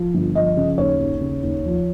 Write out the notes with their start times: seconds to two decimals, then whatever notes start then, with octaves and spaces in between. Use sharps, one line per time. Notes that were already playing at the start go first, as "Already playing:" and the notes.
Already playing: F3
0.14 G1
0.35 F3 D#5
0.57 C#3
0.78 D#2 C#5
0.99 D#2
1.21 C#3
1.43 D#2
1.65 F3